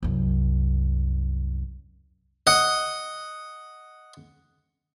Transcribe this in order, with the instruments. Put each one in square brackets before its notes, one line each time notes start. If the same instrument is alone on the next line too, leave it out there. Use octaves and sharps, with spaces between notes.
[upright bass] C2 F#2
[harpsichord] D#5 F#5